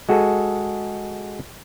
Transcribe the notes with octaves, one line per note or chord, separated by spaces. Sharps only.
G#3 F#4 G#4 A4